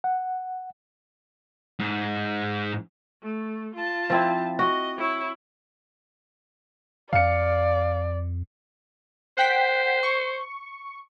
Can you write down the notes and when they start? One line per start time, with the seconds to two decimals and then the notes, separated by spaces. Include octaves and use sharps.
0.04 F#5
1.79 G#2
3.22 A3
3.75 F4 A5
4.10 F3 C4 E4
4.59 F#4 D#5
4.98 E4 C#5
7.13 F2 D5 F5 C#7
9.38 C5 F#5 G5 B6
10.03 C#6